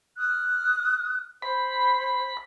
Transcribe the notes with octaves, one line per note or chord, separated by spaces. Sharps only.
D#6 F6 F#6
C5 B5